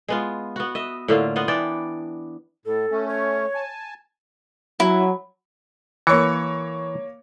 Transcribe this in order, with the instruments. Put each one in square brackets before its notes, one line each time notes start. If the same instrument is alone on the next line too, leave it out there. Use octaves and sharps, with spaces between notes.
[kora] G#3 B3 F4
B3 F#4
D#5 E5
A2 D3 A#3 F4
B3 F4 D#5 F#5
E3 D4 D5 G5
[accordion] A2 [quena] A4
[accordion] A3 C#4
[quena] C#5
[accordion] G#5 A5
[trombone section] F#3 [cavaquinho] E4
[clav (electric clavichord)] E3 [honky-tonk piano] A#3 C#5 C#7